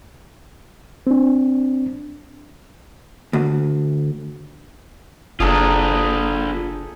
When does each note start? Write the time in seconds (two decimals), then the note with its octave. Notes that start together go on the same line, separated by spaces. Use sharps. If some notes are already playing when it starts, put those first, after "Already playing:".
1.07 C4 D4
3.33 D2
5.40 F#1 D4 F4 G#4 A4 A#5